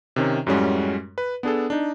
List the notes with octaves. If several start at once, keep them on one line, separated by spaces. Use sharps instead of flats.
C3 D#3 C#4
F#2 A2 G3 G#3 C#4 F#4
B4
B3 D4 G#4 A4
D4 D#4